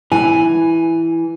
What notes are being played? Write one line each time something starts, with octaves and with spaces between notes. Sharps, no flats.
E3 G#5